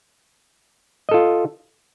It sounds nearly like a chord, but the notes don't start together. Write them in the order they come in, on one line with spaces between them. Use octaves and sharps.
D#5 A4 F4